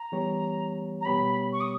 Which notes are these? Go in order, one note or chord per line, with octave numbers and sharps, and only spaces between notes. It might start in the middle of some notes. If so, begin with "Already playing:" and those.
Already playing: A#5
E3 G3 B3 G4 C#5
A#5
B2 G3 B3 G4 C#5 B5
C#6
D#6